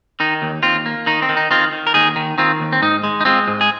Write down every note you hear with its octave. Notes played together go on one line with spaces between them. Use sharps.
D#3 D#4
D#2
D#2 C4 F4
A#3
D#3 D#4
C4
D#3
D#4
D#3 C4 F4
D#3
A#4
D#2 D#4 G#4
D#3
D#3 C4 F4
D#2
C4
G#2 D#4
G#3
D#4
G#3 C4 F4
G#2
G#4